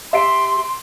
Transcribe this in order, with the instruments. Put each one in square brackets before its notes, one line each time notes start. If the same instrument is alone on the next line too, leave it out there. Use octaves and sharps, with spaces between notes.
[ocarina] G4 [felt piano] E5 C7 D7 [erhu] C6